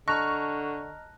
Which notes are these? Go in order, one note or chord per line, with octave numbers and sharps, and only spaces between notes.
D3 D#5 A5 A#5 C#6 F6 F#6 A#6